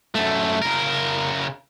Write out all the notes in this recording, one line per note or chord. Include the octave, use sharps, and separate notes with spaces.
F#2 A3
C#3 A#4